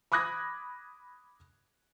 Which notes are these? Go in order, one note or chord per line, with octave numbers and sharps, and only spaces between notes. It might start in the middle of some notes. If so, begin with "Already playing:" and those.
B5 D6 D#6 F#6 G#6 A#6